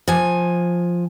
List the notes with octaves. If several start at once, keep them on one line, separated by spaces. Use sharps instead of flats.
F3 G#5